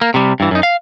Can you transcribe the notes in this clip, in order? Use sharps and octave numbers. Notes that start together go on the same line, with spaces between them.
A#3
C3 G3
G2 E3
F#2 D#4
F5